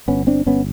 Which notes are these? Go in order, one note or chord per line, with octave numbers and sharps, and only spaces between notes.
G1 B3 C#4
C4 D4
G1 B3 C#4